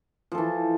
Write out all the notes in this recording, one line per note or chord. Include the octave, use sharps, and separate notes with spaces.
E3 F3 A4